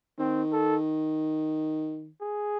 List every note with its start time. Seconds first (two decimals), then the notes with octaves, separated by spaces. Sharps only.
0.19 D#3 C4
0.52 A4
2.22 G#4